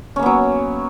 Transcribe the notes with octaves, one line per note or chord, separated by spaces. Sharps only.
F#3 A#3 B3 C#4